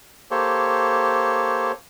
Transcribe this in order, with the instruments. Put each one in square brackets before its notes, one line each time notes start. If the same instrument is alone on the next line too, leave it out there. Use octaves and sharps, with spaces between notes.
[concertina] A#3 G4 A4 C5 C#5